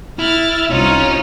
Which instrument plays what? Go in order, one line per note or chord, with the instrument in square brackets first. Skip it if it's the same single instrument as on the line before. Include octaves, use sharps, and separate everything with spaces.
[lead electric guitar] E4 [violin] F6 A6
[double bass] C2 [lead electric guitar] C#4 [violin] D#4 F4